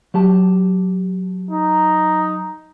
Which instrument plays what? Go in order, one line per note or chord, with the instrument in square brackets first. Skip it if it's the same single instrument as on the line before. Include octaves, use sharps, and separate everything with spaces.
[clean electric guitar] F#3 G4 A5
[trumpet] D#4